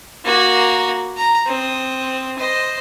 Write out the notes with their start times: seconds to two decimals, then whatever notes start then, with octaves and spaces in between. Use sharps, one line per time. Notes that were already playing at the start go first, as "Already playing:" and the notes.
0.25 A#3 F#4
1.17 A#5
1.46 C4 D#6
2.38 C5 D#5